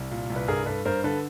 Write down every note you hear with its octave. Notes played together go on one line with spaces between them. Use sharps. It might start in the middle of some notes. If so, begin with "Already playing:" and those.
Already playing: C2
A#2
C2
B4
G2 G#4 A#4
G2 A4 B4
G2 A#4 C5
D3 A4 B4